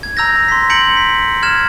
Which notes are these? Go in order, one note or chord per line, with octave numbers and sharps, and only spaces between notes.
G#6
A#5 E6 G6 A#6
C6 B6
A#5 G6 C#7 D7 F#7
B6
F6 G#6 E7